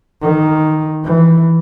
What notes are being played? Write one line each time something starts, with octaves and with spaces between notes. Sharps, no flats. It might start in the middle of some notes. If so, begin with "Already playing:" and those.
D#3
E3